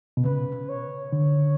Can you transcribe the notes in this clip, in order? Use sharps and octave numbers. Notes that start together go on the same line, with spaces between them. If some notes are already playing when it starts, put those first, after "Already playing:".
B2
C#3 B4
C#5
D3